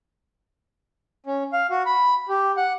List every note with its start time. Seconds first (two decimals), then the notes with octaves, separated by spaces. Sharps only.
1.26 C#4
1.53 F5
1.70 F#4
1.86 B5
2.29 G4
2.57 F#5